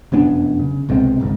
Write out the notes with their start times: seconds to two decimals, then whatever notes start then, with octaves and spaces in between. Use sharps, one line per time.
0.12 F1 F#2 B3 D4
0.60 C#3
0.89 C2 B2 G#3 C4
1.20 G#1 C#2 G#2